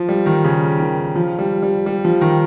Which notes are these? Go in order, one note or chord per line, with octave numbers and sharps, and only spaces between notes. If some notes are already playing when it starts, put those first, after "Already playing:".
Already playing: F3
G3
D#3
C#3
D#3
F3
G3
G3
G3
F3
D#3